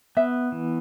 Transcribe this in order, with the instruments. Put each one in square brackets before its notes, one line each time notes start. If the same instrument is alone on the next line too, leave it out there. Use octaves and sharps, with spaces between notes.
[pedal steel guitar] B3 [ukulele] E5
[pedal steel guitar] E3